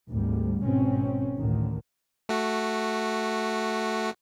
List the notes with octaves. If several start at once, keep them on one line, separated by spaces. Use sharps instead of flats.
G#1 D2 G#2 G3
G#1 B2 C4 C#4
A1 D2 D3 D#3
A3 F#4